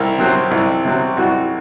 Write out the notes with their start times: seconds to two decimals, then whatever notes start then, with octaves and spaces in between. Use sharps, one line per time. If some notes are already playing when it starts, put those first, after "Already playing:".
Already playing: C2 A#4
0.18 C3 F#3 C4
0.51 C2
0.84 C3 F#3 C4
1.17 C2 F#4